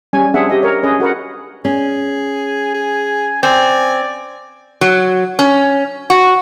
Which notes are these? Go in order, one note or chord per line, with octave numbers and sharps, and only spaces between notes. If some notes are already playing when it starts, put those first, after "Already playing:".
G3 C#4 G#5
C4 D4 G#4 E5 F#5
G4 D#5
A#4 C#5
C#4 G#4 B4 D#5
F#4 A#4 B4 F#5
C#4 G#4 G#5
G#4
C4 D5 G#5
F#3
C#4
F#4